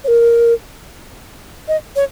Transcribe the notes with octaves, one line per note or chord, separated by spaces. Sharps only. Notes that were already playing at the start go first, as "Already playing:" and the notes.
C#5
A#4
D#5
C#5